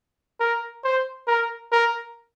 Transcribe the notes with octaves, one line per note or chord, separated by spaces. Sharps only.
A#4
C5
A#4
A#4